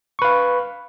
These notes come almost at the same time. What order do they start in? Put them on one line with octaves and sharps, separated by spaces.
C#6 B4 F5